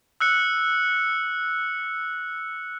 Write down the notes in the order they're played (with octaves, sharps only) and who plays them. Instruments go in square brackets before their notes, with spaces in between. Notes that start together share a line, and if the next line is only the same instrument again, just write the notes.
[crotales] E6 F#6 C#7